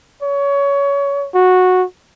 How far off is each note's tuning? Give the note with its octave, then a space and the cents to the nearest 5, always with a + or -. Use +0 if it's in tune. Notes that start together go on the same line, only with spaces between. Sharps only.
C#5 +25
F#4 -10